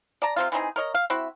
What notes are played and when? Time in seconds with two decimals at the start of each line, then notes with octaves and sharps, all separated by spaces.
0.22 D5 A5 A#5
0.36 C3 C4 F4
0.52 E3 C4 D#4 G#4
0.76 A#4 C#5 D#5
0.94 F5
1.10 C4 E4 F#4 E5